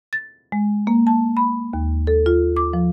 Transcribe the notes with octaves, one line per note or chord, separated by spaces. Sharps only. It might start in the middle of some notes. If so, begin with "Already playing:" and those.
A6
G#3
A#3
A5
B5
D#2
A4
F4
D6
F3